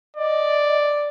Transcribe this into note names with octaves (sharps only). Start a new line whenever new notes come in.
D5 D#5